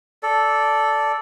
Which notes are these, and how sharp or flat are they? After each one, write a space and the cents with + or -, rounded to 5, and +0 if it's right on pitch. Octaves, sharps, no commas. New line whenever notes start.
A4 -5 D5 -10